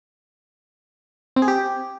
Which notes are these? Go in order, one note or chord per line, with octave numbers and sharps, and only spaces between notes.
C4
G#4
G4